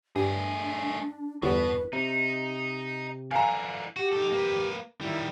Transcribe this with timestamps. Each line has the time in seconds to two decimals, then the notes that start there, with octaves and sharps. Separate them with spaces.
0.16 G2 A3 D4 G#4
1.42 G1 E2 B2 B4
1.93 C3 D#4
3.31 D3 E3 F5 G#5 A#5
3.96 F#4 G4
4.13 D#4 A4
4.32 A#3 B4
5.01 D#3 G3 E4